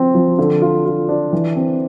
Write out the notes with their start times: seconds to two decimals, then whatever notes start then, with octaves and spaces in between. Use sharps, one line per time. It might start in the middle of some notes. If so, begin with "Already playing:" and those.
Already playing: F3 C4
0.14 F3
0.39 D3
0.62 F4
0.85 F4
1.09 D4
1.33 E3
1.56 C4